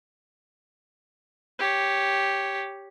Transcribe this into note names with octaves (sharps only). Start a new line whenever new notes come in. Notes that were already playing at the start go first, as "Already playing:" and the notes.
G4 C#5